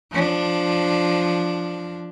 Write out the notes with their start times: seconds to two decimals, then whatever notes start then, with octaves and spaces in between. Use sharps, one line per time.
0.12 F3 D4